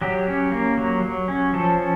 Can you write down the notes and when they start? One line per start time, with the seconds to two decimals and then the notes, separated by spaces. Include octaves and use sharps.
0.02 F#3 G4
0.28 C#4
0.52 A#3
0.77 F#3
1.02 F#3
1.28 C#4
1.53 F3 A4
1.78 C#4